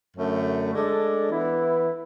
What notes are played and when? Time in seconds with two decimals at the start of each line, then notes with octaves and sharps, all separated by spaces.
0.17 F#2 D3 A3
0.73 G#3 D4 A4 D5
1.30 E3 B3 E4